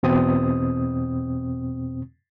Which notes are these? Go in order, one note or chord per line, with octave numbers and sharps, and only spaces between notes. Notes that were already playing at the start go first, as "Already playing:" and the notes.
E2 B2 C4 D#6